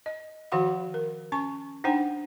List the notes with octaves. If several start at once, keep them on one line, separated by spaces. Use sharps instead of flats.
D#5
D#3 F3 F#4 F5 F#5 B5
A#4
C#4 G#5 C#6
D4 D#4 C5 F#5 G5